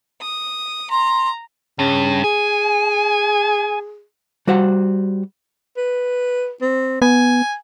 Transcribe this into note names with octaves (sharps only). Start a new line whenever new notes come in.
D#6
A#5 C6
G2 C#3
G#4 G#5
G3 F#4 C5 F#5
B4
C4
B3 G#5